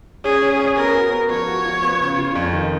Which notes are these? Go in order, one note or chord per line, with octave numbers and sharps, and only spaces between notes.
C#4 G#4
C#4
C#4
B3 A#4
F#4
B3
F3 C#5
F#4
F3
B3
C#3
F4
F2
D#3